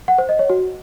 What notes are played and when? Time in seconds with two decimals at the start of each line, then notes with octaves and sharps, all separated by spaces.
0.08 F#5
0.18 C5
0.29 D#5
0.39 C#5
0.50 F#4